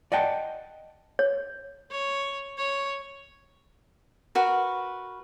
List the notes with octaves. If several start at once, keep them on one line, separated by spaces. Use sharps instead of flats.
D5 D#5 F#5 G5 A5
C#5
C#5
C#5
F#4 A#4 B4